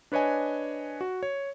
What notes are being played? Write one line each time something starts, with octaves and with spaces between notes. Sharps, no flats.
D4 B4 C#5 D#5 G#5
F#4
C#5